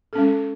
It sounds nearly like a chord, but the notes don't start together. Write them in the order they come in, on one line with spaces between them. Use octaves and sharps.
A4 C#4 G#3